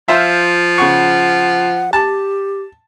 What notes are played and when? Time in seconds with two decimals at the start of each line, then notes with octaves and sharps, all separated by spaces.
0.08 F3 F4 C5 E5
0.78 C#3 F#5 C#6
1.93 G4 A5